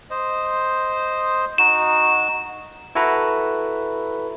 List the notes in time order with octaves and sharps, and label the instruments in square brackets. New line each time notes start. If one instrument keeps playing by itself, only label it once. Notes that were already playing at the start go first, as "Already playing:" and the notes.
[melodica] C5 D#5
[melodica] D#4 F#4 [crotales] E7
[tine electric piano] E4 F#4 A4 B4 A#5